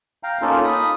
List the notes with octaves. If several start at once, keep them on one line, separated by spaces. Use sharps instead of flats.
F5 G5 A#5
A#3 C#4 D#4 F4 A4
B5 D#6